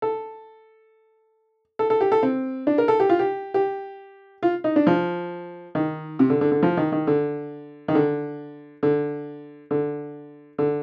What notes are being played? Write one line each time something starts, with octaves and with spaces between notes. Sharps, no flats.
A4
A4
A4
G4
A4
C4
D4
A#4
A4
G4
F4
G4
G4
F4
D#4
D4
F3
D#3
C3
D3
D3
D3
F3
D#3
D#3
D3
D#3
D3
D3
D3
D3